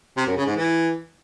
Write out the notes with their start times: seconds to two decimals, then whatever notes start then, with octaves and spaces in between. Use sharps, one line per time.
0.17 C3
0.27 F#2
0.37 C#3
0.47 G#2
0.56 E3